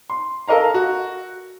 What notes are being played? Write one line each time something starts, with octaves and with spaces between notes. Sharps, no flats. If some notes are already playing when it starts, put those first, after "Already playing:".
C6
A4 A#4 D#5 F5 A#5
F#4